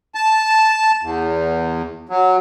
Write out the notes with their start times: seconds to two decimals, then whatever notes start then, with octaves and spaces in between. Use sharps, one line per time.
0.15 A5
1.03 E2
2.09 F#3